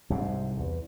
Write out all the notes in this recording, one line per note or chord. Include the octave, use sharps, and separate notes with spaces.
C2 G#2 C3
E2